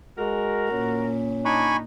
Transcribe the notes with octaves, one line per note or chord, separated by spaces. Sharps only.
G#3 F#4 A#4
A#2 C#4
D4 D#4 G#5 B5 C#6